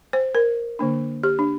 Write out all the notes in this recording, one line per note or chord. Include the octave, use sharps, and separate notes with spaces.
C5
A#4
D3 A#3 D4
G4
D4